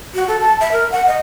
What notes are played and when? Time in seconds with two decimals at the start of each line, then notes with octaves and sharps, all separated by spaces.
0.14 F#4
0.28 A4
0.40 A5
0.61 E5
0.72 A#4
0.92 F#5
1.07 D#5